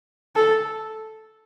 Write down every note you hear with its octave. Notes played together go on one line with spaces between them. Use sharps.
A4